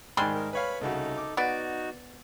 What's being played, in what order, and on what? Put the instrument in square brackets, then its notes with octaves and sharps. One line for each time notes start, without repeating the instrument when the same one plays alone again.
[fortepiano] G#2 D#3 [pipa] G3 G#3 C6
[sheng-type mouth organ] A#4
[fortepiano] B4 C#5 F5 [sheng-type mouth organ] B5
[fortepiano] C2 C#3 F#4 [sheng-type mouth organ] D#4 A4
[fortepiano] D6
[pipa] B3 D5 [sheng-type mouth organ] D#4 F#4